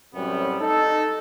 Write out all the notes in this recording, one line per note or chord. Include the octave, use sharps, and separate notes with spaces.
F#2 A2 C3 F#3 G3 B3
D#4 A4